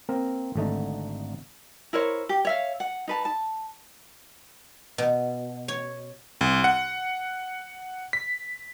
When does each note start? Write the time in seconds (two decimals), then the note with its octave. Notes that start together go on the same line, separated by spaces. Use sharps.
0.09 A#3 C4 A#4
0.55 G#1 D3 A3 D#4
1.93 E4 A#4 C5 C#5
2.29 G4
2.45 C#5 E5 F5
2.80 F#5
3.08 D#4 B4 A5
3.25 A5
4.98 B2
5.68 C#5
6.41 C2
6.64 F#5
8.13 B6